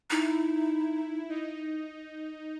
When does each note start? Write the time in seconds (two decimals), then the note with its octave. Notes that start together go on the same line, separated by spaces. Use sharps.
0.10 D#4 E4
1.29 D#4